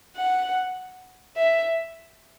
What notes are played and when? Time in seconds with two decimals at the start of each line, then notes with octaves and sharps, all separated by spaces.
0.16 F#5
1.37 E5